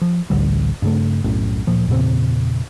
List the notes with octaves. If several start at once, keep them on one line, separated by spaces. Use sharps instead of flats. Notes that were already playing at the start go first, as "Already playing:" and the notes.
F3
A1 D2 D3 G3
G2 C#3 A3
B1 F#2 A2
D1 A#2 F3
E2 A#2 C#3 C4